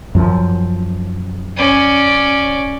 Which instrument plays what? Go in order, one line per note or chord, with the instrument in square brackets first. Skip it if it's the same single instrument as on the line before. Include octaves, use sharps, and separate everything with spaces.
[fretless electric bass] F#2 F3
[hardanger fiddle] C#4 D5